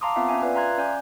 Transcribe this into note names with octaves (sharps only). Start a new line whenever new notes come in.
F5 A5 A#5 C6 D6 D#6
B3 C4 F4 E5 F5
C#4 E5 G#5
F4 B4 D5
E5 F5 A#5 C6 F#6 G#6
C#4 D5 G#5 G6